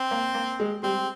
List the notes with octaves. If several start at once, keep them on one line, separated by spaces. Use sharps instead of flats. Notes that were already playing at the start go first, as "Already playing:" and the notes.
Already playing: C4
A#3
A#3
G#3
G3 C4